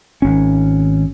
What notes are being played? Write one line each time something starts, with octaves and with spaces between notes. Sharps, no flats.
G#1 C#4